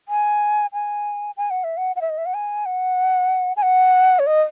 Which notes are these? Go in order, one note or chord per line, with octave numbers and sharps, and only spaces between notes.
G#5
G#5
G#5
F#5
E5
F#5
F#5
E5
D#5
E5
F#5
G#5
F#5
G#5
F#5
C#5
D#5